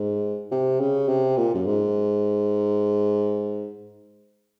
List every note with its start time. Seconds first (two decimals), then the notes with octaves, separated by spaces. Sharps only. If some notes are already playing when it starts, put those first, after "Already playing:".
Already playing: G#2
0.51 C3
0.80 C#3
1.08 C3
1.37 A#2
1.55 F#2
1.66 G#2